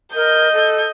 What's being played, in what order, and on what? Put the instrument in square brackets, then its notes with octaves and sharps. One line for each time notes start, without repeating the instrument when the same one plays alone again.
[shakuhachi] A#4 [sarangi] D#5 [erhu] G6
[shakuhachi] A4